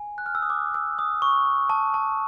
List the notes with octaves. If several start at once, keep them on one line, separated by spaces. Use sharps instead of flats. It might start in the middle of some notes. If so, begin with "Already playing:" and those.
Already playing: G#5
F#6
F6
E6
D#6
D6
E6
D#6
C#6
A5
A5